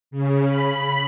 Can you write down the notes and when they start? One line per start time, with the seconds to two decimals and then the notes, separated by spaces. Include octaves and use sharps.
0.11 C#3
0.45 B5